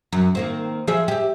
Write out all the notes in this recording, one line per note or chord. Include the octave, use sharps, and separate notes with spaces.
F#2
D#3 A#3 C4
F3 G#4 E5
G4 E5